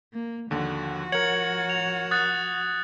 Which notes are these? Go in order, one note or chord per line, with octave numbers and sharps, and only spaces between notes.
A#3
D#2 D3 F3 F#4
A#4 C#5 G#6 C#7 F#7
F7
D#6 F#6 A6